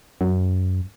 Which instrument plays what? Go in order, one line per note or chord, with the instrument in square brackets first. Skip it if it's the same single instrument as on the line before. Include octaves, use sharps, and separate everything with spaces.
[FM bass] F#2